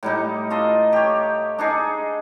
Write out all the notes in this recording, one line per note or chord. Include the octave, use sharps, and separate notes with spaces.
A2 G3 D#4
F4 A4 D#5
G4 C#5
D4 D#4 G#4